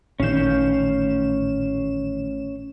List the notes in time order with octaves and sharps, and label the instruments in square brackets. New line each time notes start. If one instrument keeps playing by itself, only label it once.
[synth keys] A1 E7 [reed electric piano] A#2 D#3 [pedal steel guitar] C#4 F5 G6